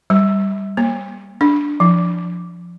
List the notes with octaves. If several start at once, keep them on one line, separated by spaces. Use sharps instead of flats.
G3
A#3
D4
F3